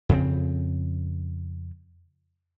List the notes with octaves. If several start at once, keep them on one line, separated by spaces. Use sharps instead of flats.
F2 C#3 C4